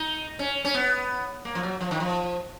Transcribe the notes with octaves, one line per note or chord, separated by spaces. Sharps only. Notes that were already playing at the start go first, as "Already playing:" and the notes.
Already playing: D#4
C#4
C#4
B3
A#3
F3
F#3
F3
D#3
F3